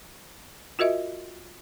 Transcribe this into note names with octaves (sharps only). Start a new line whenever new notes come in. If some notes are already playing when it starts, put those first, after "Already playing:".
F4 F#4 A#4 D#5 E5